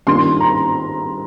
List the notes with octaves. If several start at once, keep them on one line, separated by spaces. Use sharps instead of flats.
G2 D#3 A#3 D4 F4 C6
A#5